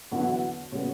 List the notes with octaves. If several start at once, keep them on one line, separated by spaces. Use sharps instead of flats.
E2 D3 F#3 B3 E4
C#3 G3 B3